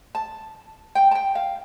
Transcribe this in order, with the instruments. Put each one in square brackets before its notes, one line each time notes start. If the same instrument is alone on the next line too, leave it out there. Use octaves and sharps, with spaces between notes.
[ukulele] A5
G5
A5
G5
F5